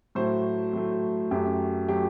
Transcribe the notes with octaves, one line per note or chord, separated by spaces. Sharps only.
A2 F#3 A3 C5
A2 F#3 A3
F#2 F#3 A3 G4
F#3 A3 G4